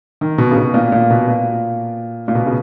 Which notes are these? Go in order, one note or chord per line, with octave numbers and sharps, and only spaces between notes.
D#3
B2
C#3
B2
A#2
A#2
B2
A#2
A#2
B2
C#3